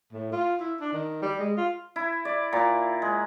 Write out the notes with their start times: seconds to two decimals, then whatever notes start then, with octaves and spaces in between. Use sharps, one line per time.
0.13 A2
0.32 F4
0.60 E4
0.80 D4
0.93 D#3
1.22 G3
1.39 G#3
1.57 F4
1.96 E4
2.25 D5
2.53 A#2
3.02 G#3